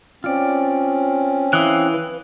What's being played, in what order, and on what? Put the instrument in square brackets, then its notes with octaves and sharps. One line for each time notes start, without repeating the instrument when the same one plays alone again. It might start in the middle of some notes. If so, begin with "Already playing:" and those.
[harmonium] C4 C#4 [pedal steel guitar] F4 D5
[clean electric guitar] E3 [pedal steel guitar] F5 D#6 F#6
[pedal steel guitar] B4